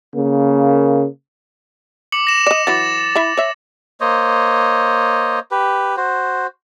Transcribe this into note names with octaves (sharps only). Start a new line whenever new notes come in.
C#3 A#3
D6 C#7 F#7
A#6 E7
D5 D#5
E3 F#3 A6
E4 E5 B5
C#5 E5
A#3 C5 C#5 D#5
G4 B4
F#4 C5